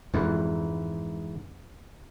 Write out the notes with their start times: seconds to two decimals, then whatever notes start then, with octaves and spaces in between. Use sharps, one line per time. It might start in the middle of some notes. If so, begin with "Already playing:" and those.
0.14 F2 G#2 E3